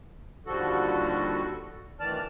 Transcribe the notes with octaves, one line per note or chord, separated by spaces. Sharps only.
D#2 D3 F3 G3 F#4 A4
D2 D#3 E3 D5 A5 F6